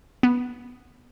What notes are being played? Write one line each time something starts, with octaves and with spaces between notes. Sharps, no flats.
B3